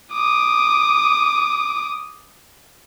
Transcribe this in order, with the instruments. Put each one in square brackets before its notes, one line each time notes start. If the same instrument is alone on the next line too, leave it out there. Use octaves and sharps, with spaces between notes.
[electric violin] D6 D#6